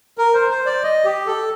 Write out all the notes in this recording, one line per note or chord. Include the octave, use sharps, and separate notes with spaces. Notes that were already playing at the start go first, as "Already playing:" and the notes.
A#4
C5
C5
D5
D#5
G4
A4